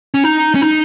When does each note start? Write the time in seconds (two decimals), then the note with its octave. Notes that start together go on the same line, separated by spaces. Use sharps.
0.14 C#4
0.24 D#4
0.55 C#4
0.62 D#4